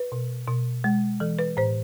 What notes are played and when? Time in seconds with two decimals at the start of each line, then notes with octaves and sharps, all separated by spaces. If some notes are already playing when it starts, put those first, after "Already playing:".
Already playing: B4
0.12 B2
0.47 B2
0.84 G#3
1.20 E3 A4
1.39 B4
1.57 A2 C5